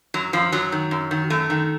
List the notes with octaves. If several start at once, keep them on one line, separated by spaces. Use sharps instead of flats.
F#2 F#3
F#2 F3
F#2 F#3
D#3
F#2
D#3
F#2 A3
D#3